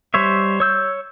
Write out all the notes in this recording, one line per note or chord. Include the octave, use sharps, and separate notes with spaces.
G3 C5 C#5 E5
C#5 E6 G6